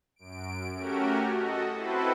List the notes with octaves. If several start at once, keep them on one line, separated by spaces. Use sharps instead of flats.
F#2 D7
A3 C#4 F#4 G4 A#4
F#4 A4 D#5
C4 E4 F#4 A4 B4 C5